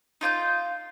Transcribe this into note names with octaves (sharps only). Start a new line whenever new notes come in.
D#4 F4 D6 G6